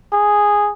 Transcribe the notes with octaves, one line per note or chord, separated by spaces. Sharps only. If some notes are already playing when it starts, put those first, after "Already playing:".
G#4